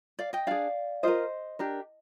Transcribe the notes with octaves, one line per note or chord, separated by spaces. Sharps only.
D5 F5
D#5 G5
D4 G#4 D5 F5
F4 A#4 C5 D#5
D4 G4 A#4